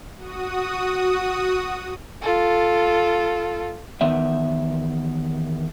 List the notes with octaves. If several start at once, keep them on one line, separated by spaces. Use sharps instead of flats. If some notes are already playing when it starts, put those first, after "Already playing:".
F#4 D#6
F4 A4
E2 D#3 B3 E5